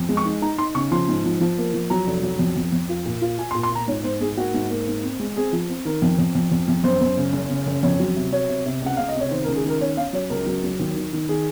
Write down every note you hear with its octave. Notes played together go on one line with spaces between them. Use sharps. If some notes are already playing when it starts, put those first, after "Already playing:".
Already playing: F2
G#3
C#6
D#4
D#4 A#5
D#4 C6
C#3 C#6
F3 C6
G#2
F3
F3
A#3
F3
F#3 A#5
F1
F#3
F2
F2
F2
F4
A#2
F4
F4 G#5
C6
A#2
C6
F4 A#5
G#2 C#5
G#2 C5
G#2 G#4
A#3 F#4
G#2
A#3
G#2
C4
G#3
C4 G#4
F3
C4
D#3 A#4
F2
F2
F2
F2
F2
F#2 C5
F#2
C#3
F#1
C#3
F#1
F2 C#5
F#3
C3
F#3 C#5
C3
C3
C#2 F#5
C#2 F5
D#5
C3 C#5
D#3 C5
A#4
C#2
G#4
D#3 A#4
C#4 C#5
C#4 F5
F#3 C#5
C#2 A#4
F#3
F#3
D#2
D#3
D#3
D#3 G#4